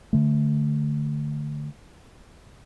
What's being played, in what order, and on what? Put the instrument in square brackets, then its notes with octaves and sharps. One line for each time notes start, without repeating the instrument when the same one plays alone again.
[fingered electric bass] D3 A3